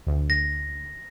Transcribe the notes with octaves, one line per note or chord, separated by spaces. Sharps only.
D2
A#6